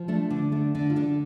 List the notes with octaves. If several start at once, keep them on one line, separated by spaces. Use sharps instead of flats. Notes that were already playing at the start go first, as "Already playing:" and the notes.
Already playing: F3
A3 D4
D3 D4
A3 D4
D3 D4
F4
D3 D4